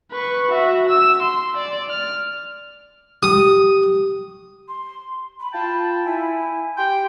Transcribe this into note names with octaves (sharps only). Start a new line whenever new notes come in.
B4 C#6
F#4 E5
E6
C6
D5
F6
G4 D#6
C6
B5
F4 G5 A5
E4 G#5
G4 G5 C6